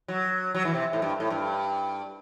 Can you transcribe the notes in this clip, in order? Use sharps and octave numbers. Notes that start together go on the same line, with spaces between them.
F#3
F#3
E3
C3
A2
G2
A2
G2